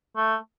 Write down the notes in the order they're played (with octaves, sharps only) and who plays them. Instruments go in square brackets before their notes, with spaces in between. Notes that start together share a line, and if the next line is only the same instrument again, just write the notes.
[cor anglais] A3